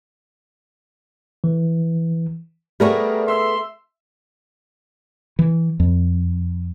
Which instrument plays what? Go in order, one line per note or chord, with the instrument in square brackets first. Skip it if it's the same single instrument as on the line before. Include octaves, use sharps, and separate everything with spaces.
[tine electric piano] E3
[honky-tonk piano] G3 A#4 C#6 [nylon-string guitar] A3 B3 G#4
[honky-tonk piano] E5 E6 [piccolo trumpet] C6
[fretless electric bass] E3
F2